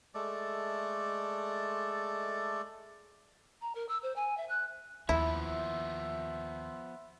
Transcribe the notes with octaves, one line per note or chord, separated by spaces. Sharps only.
G#3 A3 A4 D5
A#5
A#4
E6
C5
G#5
E5
F#6
D#2 F3 B3 E4 E5